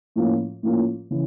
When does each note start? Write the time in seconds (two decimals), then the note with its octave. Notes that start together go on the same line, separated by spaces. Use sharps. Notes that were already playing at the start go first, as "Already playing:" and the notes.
0.16 A2 F3 A#3 C#4 F4
0.63 A2 F3 A#3 C#4 F4
1.11 C#3 E3